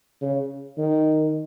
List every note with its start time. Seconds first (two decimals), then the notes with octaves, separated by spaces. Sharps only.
0.21 C#3
0.78 D#3